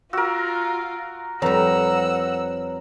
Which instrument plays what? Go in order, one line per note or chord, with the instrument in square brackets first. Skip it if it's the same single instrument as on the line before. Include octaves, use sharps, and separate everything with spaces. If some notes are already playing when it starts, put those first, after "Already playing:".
[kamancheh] F4 [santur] F#4 A#4 [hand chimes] E6
[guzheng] F2 G3 [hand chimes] B4 C#5 [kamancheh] F#5 E6 [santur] A#5